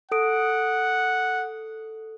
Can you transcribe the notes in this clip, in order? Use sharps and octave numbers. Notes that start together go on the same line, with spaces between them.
A4 F#5 D#6 D7